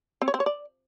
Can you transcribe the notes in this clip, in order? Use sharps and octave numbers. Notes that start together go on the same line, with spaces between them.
C4
C#5
C4
C#5
D5